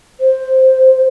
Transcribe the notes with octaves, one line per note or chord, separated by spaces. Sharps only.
C5